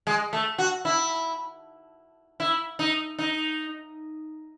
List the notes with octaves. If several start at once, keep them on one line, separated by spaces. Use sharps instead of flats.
G#3
A3
F#4
E4
E4
D#4
D#4